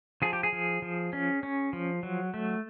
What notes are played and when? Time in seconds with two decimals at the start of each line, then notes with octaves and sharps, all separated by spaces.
0.22 F3 G#4
0.33 G4
0.43 G#4
0.53 F3
0.82 F3
1.13 C#4
1.43 C#4
1.73 F3
2.03 F#3
2.34 A3